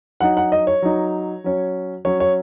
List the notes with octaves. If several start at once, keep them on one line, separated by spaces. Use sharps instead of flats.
F#3 D#4 F#5
F#5
D#5
C#5
F#3 D#4
F#3 C#4
F#3 C#4 C#5
C#5